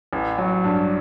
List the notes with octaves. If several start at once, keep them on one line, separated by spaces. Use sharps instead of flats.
A1
F#3
G2